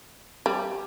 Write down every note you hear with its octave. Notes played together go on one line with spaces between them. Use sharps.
G3